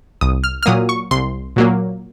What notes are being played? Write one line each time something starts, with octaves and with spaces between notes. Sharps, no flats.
C2 D#6
F6
F6
A#2 F#3 A#3 D#6
C#6
C2 C6
A#2 F#3 A#3